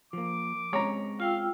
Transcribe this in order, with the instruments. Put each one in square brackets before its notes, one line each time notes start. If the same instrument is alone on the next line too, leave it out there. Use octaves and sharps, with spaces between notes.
[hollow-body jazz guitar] F3 A#3 [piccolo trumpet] D6
[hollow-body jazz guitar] G#3 C4 C#4 [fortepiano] C#5 A#5
[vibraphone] F4 G5 E6 [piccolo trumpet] F5